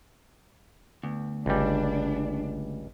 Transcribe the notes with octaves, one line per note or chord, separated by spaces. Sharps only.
D2 B3
G1 C#2 G3 D4